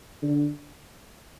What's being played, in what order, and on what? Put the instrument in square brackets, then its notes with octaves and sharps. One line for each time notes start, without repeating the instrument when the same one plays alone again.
[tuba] D3